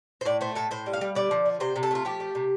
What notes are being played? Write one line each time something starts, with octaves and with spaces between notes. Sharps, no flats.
C5
A2 D5
A3 C5
A2 A4
A2 C5
G3
F5
G3
D3 D5
F3
D3
C3 C5
C3
A4
A3 F4
F3 G4
A3
C3